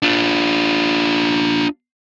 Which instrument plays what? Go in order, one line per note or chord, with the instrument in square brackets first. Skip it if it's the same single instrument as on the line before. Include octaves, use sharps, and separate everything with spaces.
[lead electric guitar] D4 F4